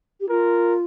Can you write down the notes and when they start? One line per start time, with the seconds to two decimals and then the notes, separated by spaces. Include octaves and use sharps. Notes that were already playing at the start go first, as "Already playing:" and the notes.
0.20 G4
0.29 F4 A#4